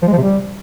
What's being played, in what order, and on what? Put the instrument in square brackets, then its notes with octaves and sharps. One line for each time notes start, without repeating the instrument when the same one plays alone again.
[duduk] F3
G#3
F3
C3
G3